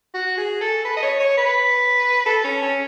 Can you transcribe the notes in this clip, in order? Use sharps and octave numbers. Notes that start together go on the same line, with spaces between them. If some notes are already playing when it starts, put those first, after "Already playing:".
F#4
G#4
A4
B4
D#5
C#5
C#5
B4
A4
C#4
C#4